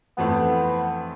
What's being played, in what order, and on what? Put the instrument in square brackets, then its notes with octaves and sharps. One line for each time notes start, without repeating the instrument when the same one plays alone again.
[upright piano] F2 E3 A3 C4 [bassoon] B3